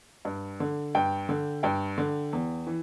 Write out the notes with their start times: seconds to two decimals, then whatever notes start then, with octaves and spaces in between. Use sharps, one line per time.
0.25 G2
0.60 D3
0.95 G2 G5
1.29 D3
1.63 G2 G5
1.98 D3
2.33 E2
2.67 E3